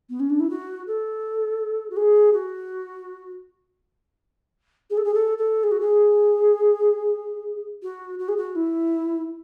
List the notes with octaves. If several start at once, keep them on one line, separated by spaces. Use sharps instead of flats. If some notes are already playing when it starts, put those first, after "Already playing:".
B3
C#4
D4
E4
F#4
A4
F#4
G#4
F#4
G#4
A4
G#4
A4
A4
G#4
F#4
G#4
F#4
F#4
G#4
F#4
E4